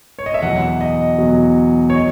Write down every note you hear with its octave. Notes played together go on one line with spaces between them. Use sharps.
C#5
D#5
E5
E2 B2 F#3 F#5
D#5
E2 B2 F#3
C#5
D#5